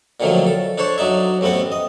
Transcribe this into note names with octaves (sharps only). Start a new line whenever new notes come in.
A#2 D3 D#3 F3 F#3 A3
A4
D4 A4 C5 C#5
F#3 D4 D#4 E5
A1 A3 B3 C4 F#5
D#5